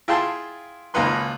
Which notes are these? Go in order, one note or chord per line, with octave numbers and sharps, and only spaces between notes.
E4 F4 G#4 G5 A5 C6
G#1 C#2 A#3 D#4 B4 C6